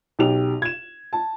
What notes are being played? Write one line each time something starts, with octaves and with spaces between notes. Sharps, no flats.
B1 G4 F7
G#6 E7
A5